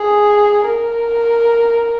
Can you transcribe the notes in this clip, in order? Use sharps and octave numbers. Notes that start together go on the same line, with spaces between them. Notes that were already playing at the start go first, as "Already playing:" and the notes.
Already playing: G#4
A#4